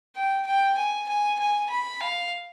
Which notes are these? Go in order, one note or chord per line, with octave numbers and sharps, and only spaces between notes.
G5
G5
G#5
G#5
G#5
B5
F5